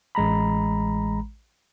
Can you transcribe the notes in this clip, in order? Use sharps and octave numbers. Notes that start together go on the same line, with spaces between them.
A1 G#3 A#5 B5